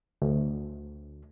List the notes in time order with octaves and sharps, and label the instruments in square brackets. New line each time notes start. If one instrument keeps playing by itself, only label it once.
[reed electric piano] D2